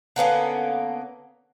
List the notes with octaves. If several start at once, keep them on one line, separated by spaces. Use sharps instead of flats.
D3 A#3 B3 C#4